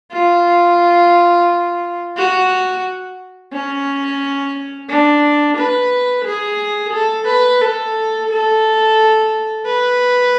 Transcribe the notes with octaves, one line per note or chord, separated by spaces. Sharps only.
F4
F#4
C#4
D4
B4
G#4
A4
B4
A4
A4
B4